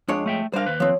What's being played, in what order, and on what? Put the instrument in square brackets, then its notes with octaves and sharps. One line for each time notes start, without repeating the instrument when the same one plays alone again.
[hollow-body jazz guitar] F2 G#3 C#5 [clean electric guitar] D4
[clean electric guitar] A3 E5 G5
[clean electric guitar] G3 D4 A#4 [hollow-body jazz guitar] C5 F5
[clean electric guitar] D#2 B4
[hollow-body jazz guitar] F3 C4 [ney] C#5